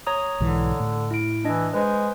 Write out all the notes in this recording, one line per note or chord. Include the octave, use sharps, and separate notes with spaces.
C#5 A#5 D#6
B1 G#2 D3 E3
A2
E4 D7
E3 D4 D#5
G#3 B4 C5